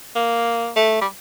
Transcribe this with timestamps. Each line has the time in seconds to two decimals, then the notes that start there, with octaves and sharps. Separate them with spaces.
0.15 A#3
0.76 A3
1.01 G3